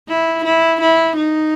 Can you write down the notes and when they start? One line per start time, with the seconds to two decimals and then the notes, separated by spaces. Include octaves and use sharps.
0.08 E4
0.45 E4
0.81 E4
1.17 D#4